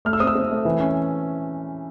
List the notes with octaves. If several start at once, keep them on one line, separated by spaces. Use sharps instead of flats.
A3 F6
E6
C4 D#6
E6
C4
A3
E3
C#4